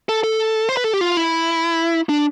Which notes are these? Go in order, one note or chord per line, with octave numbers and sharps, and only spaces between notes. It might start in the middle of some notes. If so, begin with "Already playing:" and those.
A4
A4
C5
B4
A4
G4
F4
E4
D4